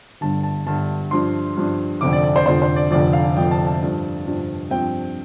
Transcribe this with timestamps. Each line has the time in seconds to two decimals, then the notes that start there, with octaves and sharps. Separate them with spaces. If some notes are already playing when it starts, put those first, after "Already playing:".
0.21 G1 G2 D3 A5
0.43 A5
0.66 G1 G2 D3 A5
1.11 G2 F3 D4 C6
1.57 G2 F3 D4
2.01 F1 F2 D3 F3 D6
2.13 D5
2.24 D5
2.36 C5
2.46 F1 F2 D3 F3 C5
2.62 C5
2.76 D5
2.91 F1 F2 D3 F3 D5
3.13 F5
3.37 F1 F2 D3 F3 G5
3.51 A5
3.67 A5
3.81 G2 F3 D4
4.26 G2 F3 D4
4.71 G2 F3 C4 G5